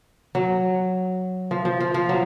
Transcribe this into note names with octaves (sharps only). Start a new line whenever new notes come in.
F#3
F3
F3
F3
F3
F#3